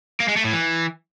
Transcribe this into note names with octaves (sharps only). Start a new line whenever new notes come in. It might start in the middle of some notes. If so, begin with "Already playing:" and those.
A#3
G#3
A3
A2
E3